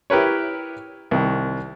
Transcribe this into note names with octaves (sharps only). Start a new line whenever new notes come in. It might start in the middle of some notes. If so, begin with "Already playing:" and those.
E4 G4 A#4 B4 C#5
C2 D#3